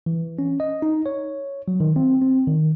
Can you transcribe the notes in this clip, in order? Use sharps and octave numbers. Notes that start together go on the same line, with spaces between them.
E3
C#4
D#5
D#4
C#5
F#3
D#3
C4
C4
D#3